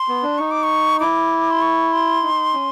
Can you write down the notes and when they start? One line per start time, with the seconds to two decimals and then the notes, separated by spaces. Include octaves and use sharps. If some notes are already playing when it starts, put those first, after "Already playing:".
Already playing: C6
0.08 B3
0.23 D4
0.38 D#4 C#6
0.51 D6
0.63 C#6
1.00 E4 D6
1.51 C6
1.62 C#6
1.93 C6
2.23 D#4
2.54 C#4